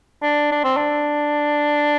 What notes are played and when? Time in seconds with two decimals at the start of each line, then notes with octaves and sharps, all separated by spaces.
0.22 D4
0.51 D4
0.64 C4
0.77 D4